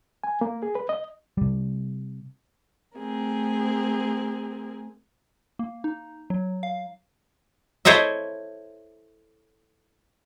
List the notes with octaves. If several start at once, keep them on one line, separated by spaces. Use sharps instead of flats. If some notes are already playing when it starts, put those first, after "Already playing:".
G#5
A#3
G#4
B4
D#5
C3 G3
A3 C4 G#4 A#4
A#3
D#4
F#3
F5
E4 A4 C5 C#5 D#5 E5